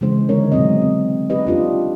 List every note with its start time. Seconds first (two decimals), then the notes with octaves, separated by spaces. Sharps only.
0.01 C#3 E3 G#3 C5
0.29 D3 G#3 D#4 A#4 C#5
0.52 B2 F#3 G#3 C4 D#5
0.82 C4
1.30 D#4 G4 B4 D#5
1.47 D4 F4 G4